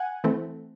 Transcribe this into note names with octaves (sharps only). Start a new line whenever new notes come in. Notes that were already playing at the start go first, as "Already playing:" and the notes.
Already playing: F#5 G#5
E3 A3 C4